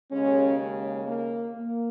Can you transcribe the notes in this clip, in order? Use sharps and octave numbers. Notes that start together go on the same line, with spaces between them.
D#2 C#3 G#3 C#4
G#3
A#3
A#3